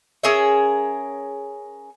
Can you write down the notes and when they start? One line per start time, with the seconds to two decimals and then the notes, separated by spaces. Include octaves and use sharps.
0.23 C#4 G#4 A#4 E5